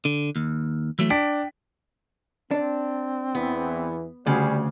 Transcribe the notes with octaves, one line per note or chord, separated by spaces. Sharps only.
D3
D#2
E3 F#3 A3
D4 G5 B6
C4 D4
E2 E3 B3
D2 C#3 G3 F#4 G#4